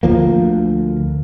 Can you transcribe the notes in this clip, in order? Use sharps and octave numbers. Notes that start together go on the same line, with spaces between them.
D2 F3 A#3